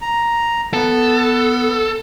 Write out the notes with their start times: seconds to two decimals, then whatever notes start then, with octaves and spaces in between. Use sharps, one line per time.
0.01 A#5
0.73 B3 A4